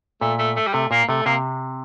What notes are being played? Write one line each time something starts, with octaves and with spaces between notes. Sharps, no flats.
A#2 A3
A3
A3
G3
C3 A3
A#2 A#3
C3 A3
C3 A#3